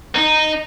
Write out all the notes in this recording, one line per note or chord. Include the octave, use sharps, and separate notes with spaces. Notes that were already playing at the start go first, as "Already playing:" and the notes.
D#4